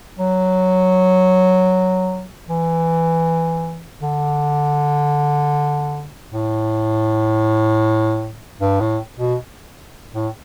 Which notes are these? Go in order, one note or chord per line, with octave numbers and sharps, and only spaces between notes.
F#3
E3
D3
A2
G2
A2
B2
A2